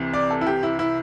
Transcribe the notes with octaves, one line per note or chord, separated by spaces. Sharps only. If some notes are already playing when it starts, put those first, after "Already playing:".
Already playing: C2 C3 E3
D5
A4
E4
G4
E4
E4